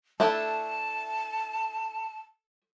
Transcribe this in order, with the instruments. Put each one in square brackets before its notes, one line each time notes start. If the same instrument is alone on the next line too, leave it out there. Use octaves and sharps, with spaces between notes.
[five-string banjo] A3 D4 E4 [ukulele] A4 E5 [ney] A5